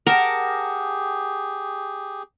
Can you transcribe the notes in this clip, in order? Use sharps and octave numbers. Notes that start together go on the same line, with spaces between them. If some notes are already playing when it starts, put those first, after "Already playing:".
G4 G#4 A#4 F#5 A5